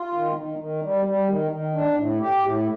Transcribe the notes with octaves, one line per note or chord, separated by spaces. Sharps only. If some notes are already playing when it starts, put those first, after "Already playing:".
Already playing: F4
D#3
D#3
D#3
G3
G3
D#3
D#3
D4
A2
G4
A2